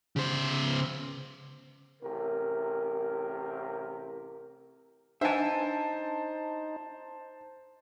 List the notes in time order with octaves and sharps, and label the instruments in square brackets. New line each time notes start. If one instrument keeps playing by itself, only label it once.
[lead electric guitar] C#3 C5
[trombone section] A1 C3 A#4
[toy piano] D4 B4 F#5 [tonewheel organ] D#4 [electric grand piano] C5 A5 [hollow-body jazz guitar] E5 G#5